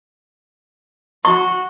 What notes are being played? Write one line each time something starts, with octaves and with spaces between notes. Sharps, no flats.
F#4 C#6